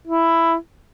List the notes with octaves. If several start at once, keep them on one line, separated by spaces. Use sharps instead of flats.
E4